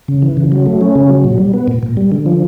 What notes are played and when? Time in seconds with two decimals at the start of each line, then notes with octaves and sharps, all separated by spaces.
0.08 C#3
0.22 E3
0.37 C#3
0.52 F#3
0.66 A3
0.81 C#4
0.95 C#3
1.10 F#3
1.24 A#2
1.38 G3
1.54 B3
1.68 A#2
1.83 A#2
1.97 G3
2.12 D3
2.26 F3